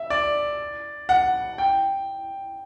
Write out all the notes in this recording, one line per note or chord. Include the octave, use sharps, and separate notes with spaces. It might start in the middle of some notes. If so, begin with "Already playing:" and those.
Already playing: E5
D5
F#5
G5